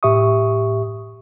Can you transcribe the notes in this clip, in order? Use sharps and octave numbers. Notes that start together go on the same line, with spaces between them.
A2 G4 E5 C#6 D#6